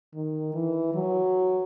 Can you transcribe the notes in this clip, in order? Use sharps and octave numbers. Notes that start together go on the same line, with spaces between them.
D#3
E3
F#3